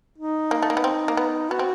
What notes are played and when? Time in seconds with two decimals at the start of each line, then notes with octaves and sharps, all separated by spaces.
0.19 D#4
0.51 A#3
0.63 A3
0.70 A#3
0.77 B3
0.84 C4
1.08 A#3
1.17 B3
1.50 B3 F#4
1.59 C4